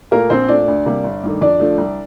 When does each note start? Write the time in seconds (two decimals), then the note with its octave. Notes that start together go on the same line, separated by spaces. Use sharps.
0.11 A#2 A3 A#3 A#4
0.30 A#1 C4 C5
0.48 A#2 A3 D4 D5
0.68 D2
0.86 C3 G3 A#3
1.04 G1
1.23 G2 D#3 A3
1.41 F2 D4 D5
1.60 D3 F3 A3
1.78 C2